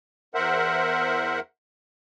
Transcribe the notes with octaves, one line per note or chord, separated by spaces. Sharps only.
E2 A#4 C5 E5 F#5